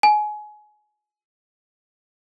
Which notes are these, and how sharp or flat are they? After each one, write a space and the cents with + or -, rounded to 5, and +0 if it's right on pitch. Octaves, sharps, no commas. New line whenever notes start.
G#5 +25